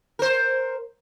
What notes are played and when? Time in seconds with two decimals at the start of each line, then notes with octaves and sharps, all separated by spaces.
0.19 A#4 C5